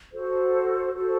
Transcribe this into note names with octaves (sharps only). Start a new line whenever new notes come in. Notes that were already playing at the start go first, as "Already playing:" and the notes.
F#4 A4 C5
F#4 A4 C5